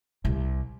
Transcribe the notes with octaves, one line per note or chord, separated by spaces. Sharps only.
C2